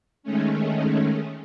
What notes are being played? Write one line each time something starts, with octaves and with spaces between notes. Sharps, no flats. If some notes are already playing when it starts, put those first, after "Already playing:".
D#3 G#3 A3 C#4